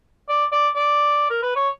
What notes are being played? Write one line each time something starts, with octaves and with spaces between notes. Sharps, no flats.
D5
D5
D5
A#4
B4
C#5